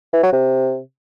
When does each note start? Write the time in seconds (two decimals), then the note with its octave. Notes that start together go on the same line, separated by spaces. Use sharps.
0.13 E3
0.23 F#3
0.32 C3